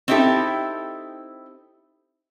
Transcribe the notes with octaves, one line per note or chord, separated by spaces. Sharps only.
C4 D#4 E4 G4 A4